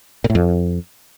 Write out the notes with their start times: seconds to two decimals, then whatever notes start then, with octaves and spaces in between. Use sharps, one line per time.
0.24 A#2
0.30 A2
0.35 F2